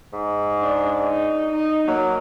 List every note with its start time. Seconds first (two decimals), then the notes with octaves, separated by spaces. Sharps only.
0.13 G#2
0.61 D4
1.04 D#4
1.51 D#4
1.88 F#3 A#3